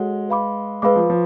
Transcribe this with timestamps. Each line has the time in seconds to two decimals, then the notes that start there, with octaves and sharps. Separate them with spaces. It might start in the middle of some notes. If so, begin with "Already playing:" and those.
Already playing: G#3 F#4 A4 C#5 F#5
0.29 B4 F5 B5 D6
0.82 G#3 B4 F5 B5 D6
0.96 F3
1.10 F3